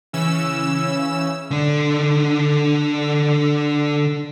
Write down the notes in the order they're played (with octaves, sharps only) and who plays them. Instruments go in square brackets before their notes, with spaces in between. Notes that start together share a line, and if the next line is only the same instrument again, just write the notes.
[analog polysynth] C#3 E3 C#4 E6
[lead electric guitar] D3 D4